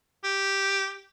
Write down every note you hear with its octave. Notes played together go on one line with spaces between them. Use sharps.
G4